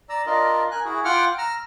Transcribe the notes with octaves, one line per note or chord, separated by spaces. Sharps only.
D5 A#5 E6
D4 F4 A#4 D5 D#5
A#4 G#5 F#6
E4 F#4 G#4
F4 F#5 G5 D6 F6
A#5 E6 F6